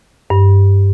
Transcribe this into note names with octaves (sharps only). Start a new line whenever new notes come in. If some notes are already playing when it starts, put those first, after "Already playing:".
G2